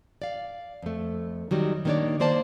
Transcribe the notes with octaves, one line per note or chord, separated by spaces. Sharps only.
D5 F5
F2 A3
D#3 F#3 G3
D#3 A#3 B3 D4 C#5 D5
D#3 A#3 C5 D5 A5